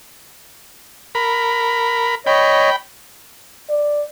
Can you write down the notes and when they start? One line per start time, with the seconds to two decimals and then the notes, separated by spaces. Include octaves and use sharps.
1.15 A#4 B5
2.27 C#5 D#5 G5 B5
3.69 D5